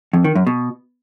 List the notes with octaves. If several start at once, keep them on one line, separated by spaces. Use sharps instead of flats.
F2
D#3
F#2
B2